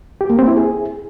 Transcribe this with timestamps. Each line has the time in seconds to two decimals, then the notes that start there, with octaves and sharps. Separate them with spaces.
0.21 G4
0.30 A#3
0.39 C4
0.48 E4
0.57 G#4